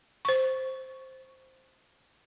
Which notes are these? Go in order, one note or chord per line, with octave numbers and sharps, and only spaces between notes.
C5 C#6